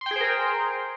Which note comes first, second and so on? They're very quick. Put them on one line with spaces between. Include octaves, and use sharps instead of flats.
C6 G5 G#4 C5 A#4